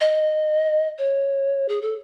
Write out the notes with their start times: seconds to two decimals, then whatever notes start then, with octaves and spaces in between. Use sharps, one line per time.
0.01 D#5
0.98 C#5
1.68 G#4
1.82 A4